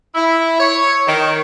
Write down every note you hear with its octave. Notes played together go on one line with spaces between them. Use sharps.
E4
C#5
D#3